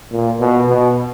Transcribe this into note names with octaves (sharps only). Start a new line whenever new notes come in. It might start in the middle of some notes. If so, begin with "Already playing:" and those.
A#2
B2
B2